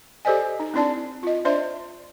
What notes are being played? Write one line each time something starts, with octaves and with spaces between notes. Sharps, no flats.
G4 A4 C5 D5 D#5 G#5
D#4
C4 D4 E4 D5 A5
F4 D#5
D4 C5 D5 E5 C6